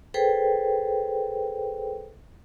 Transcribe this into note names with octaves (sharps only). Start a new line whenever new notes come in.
G#4 A4 B4 C5 G5